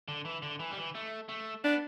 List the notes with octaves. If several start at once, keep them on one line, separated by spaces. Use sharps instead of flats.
D3
E3
D3
E3
G3
E3
A3
A3
B3 D4